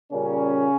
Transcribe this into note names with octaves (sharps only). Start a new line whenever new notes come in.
A#2 C#3 G3 A#3 C#4